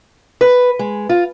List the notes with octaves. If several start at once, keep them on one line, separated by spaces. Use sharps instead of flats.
B4
G#3
F4